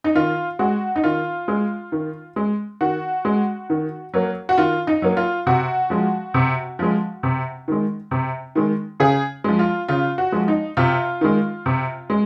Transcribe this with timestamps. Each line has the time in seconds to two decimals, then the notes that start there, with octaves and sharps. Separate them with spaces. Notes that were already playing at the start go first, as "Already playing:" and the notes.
0.04 D#4
0.15 D#3 F4
0.59 G#3 F#4
0.96 D#4
1.04 D#3 F4
1.48 G#3
1.92 D#3
2.36 G#3
2.81 D#3 F#4
3.25 G#3
3.70 D#3
4.14 F#3 A#3
4.49 F#4
4.58 D#3 F4
4.87 D#4
5.02 F#3 A#3
5.17 F4
5.46 C3 F#4
5.90 F3 G#3
6.34 C3
6.79 F3 G#3
7.23 C3
7.68 D#3 G#3
8.11 C3
8.55 D#3 G#3
9.00 C#3 G#4
9.44 F3 G#3
9.59 F4
9.88 C#3 F4
10.18 F#4
10.32 F3 G#3
10.48 D#4
10.77 C3 F4
11.21 D#3 G#3
11.66 C3
12.10 G#3